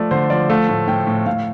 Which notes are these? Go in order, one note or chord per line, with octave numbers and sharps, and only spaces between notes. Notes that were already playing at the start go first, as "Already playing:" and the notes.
Already playing: F3 A3 D5
D3 C5
F3 D5
A3 F5
A2
A2 G5
A2
A2 F5